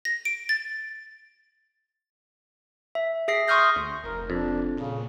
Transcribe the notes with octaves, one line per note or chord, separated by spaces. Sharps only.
A#6
D7
A6
E5
G#4 E5 A#6 C7
C6 C#6 D#6 F6 G6 A#6
D2
F1 A#4
F2 D4
A#2 C#3